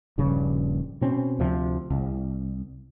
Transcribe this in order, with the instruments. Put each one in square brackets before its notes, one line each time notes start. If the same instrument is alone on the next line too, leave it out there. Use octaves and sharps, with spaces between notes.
[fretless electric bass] D#1 A#1 G2 C#3
B2 C4 C#4
D2 C3 F3
C2